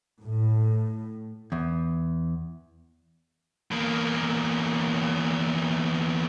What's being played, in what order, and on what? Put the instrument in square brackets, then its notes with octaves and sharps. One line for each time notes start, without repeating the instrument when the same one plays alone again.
[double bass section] A2
[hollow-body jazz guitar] E2
[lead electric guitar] E2 A#3